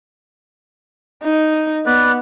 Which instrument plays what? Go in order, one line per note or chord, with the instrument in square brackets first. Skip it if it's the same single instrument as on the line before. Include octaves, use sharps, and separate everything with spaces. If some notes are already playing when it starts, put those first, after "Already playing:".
[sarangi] D#4
[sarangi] B3 [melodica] B4 D5